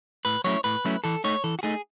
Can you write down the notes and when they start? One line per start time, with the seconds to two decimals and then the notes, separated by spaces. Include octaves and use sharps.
0.25 A2 B4
0.44 F#3 A3 C#4 E4 C#5
0.64 A2 B4
0.85 F#3 A3 C#4 E4
1.04 E3 A4
1.24 A3 D#4 C#5
1.44 E3 A4
1.59 F#4
1.63 A3 D#4 G#4